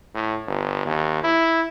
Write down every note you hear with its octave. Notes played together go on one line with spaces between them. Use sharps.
A2
G1
D#2
E4